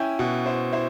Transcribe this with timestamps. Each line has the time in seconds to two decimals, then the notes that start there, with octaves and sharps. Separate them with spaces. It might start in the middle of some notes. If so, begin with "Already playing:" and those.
Already playing: C#4 E4 G5 G#5
0.19 B2 F#5
0.46 E4 C5
0.72 E4 C5